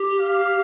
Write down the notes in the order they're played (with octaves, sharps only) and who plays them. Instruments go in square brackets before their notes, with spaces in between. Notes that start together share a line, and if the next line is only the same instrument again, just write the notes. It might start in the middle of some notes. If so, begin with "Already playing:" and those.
Already playing: [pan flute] G4
[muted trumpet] F5